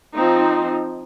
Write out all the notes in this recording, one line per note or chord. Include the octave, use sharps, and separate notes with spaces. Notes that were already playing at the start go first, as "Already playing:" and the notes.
F3 C4 D#4